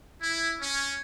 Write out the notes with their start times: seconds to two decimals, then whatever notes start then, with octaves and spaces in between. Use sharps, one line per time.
0.20 E4
0.58 C#4